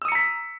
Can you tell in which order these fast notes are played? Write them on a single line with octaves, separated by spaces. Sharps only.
E6 D#6 C#7 A#5 B6